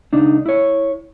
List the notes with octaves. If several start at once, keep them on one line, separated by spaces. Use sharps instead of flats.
C#2 D4 D#4
E4 C#5